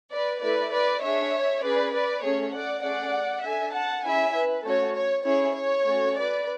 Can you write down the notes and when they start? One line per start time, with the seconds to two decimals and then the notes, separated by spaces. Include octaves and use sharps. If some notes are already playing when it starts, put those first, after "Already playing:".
0.12 B4 D5
0.41 A3 E4 A4 B4 D5
0.72 B4 D5
1.03 D4 G#4 C#5 E5
1.62 C#4 G#4 B4 D5
1.92 B4 D5
2.23 A3 C#4 G#4 C#5
2.53 D5 F#5
2.83 A3 C#4 G#4 D5 F#5
3.43 D4 A4 E5 G#5
3.73 F#5 A5
4.04 C#4 E4 G#4 E5 G#5
4.34 B4
4.64 A3 C#4 F#4 A4 C#5
4.94 C#5
5.25 C#4 E4 G#4 C#5
5.55 C#5
5.85 A3 C#4 F#4 A4
6.15 B4 D5